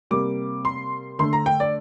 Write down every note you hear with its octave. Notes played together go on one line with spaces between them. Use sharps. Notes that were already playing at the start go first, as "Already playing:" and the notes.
C3 G3 A#3 D6
C6
D3 A3 C6
A#5
G5
D5